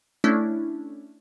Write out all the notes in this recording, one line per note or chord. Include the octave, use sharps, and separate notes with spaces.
A3 C#4 D4 E4